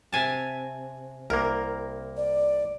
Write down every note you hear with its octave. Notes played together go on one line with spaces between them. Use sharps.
C3 G#5 A5
C2 A#3 A#4
D5